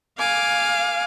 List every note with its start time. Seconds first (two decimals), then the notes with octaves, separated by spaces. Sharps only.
0.19 F5 G#5 D6